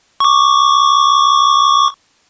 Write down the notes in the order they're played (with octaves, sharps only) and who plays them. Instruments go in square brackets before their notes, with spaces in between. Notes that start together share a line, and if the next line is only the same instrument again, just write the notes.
[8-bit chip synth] C#6 D6